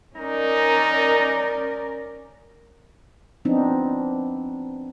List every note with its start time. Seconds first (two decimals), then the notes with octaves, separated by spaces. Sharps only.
0.16 C#4 D#4 A#4 D5
3.45 F3 B3 C4 D4 D#4